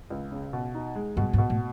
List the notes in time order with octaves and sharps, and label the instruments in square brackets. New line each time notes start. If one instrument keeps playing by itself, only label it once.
[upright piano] C#2
C#3
B2
D#4
G#3
[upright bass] G2 [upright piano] B2
[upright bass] G#2
[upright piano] B2
[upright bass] A2